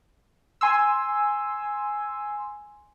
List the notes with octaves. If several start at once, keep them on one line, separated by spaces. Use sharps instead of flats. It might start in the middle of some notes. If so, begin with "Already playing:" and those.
G#5 C6 E6